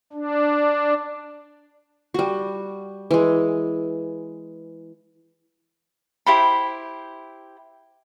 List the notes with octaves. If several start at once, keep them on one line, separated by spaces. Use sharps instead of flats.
D4
G3 F#4
E3 G#3
E4 G4 C5 B5